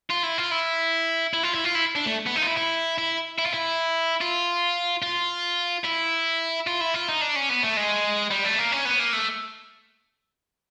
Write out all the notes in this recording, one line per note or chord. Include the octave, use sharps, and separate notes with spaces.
F4
E4
F4
E4
E4
F4
E4
F4
E4
D4
A3
B3
D#4
F4
E4
E4
E4
E4
F4
E4
F4
F4
E4
F4
E4
F4
D#4
D4
C#4
B3
A3
G#3
G3
A3
A#3
C#4
B3
A#3
A3